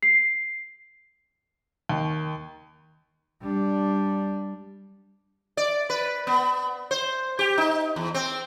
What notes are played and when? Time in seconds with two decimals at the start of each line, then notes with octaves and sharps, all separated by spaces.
0.03 C7
1.89 D#2
3.41 G3 D4
5.57 D5
5.90 B4
6.27 B3
6.91 C5
7.39 G4
7.58 D#4
7.96 E2
8.14 C4